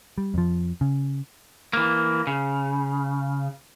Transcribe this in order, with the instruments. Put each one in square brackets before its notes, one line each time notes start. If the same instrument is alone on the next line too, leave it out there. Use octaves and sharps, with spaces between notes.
[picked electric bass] G3
F2 F3
C#3
[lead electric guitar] E3 A#3
C#3